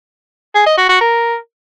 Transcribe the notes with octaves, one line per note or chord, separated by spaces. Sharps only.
G#4
D#5
F#4
F#4
A#4